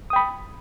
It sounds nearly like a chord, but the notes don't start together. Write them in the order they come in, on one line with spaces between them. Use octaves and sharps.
D#6 G5 B5